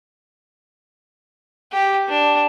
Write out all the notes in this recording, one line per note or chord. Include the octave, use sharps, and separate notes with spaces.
G4
D4